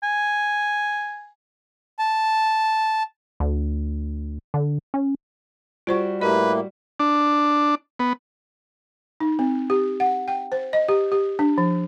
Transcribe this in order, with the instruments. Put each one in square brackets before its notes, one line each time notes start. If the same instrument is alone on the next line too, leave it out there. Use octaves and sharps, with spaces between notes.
[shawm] G#5
[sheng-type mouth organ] A5
[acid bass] D2
D3
C#4
[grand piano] G3 F#4 [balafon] F4 C5 C#6
[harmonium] A2 A#3 [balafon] G4 D#5 [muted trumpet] B4
[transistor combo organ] D4
B3
[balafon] D#4
C4
G4
F#5
G5
C5
D#5
G4
G4
D4
F3